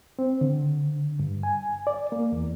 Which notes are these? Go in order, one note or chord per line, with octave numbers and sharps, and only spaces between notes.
C4
D3
G2
G#5
D5
A#3
E2